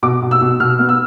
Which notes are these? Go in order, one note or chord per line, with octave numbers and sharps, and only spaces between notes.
B2 D6
B2
E6
B2
B2 F6
B3
E6